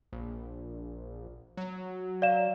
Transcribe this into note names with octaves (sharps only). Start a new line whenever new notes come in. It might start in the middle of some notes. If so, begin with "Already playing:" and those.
A#1
F#3
D5 F5 E7